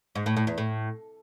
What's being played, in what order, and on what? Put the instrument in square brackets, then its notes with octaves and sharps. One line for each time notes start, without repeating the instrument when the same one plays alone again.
[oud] G#2
A2
A2
E2
A2